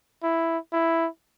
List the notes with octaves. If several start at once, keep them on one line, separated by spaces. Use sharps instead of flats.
E4
E4